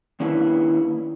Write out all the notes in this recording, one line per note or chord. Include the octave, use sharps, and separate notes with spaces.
D#3 A#3 C#4 D4 E4 B4